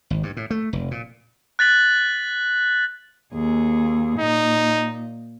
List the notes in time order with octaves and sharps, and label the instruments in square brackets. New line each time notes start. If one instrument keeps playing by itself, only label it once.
[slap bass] G#1
G2
A2
A3
F1
A#2
[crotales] F#6 A6 B6 F#7
[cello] D#2 G#4
[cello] A#2 [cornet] D#4